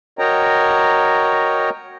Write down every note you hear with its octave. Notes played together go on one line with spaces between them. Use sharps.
F#4 A#4 C#5 D#5 G5 A#5